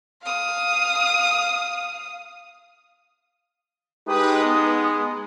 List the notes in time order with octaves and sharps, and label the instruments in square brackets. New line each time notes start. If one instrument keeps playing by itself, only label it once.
[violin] F5 D#6
[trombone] G#3 [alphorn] D#4 [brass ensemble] G4 B4 [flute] D#6
[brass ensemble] B3